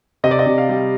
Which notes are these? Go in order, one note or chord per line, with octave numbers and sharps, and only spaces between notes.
C3 D#5
D5
D#5
C3
F5
G3